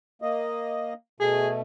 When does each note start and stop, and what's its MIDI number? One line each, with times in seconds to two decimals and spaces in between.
0.22 0.93 58
0.22 0.93 75
1.20 1.61 47
1.20 1.61 57
1.20 1.49 68